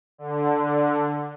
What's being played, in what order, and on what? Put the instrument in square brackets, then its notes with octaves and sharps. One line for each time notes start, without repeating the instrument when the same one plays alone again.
[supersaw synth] D3